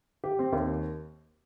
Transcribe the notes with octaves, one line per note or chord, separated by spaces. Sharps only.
G4
C4
D#2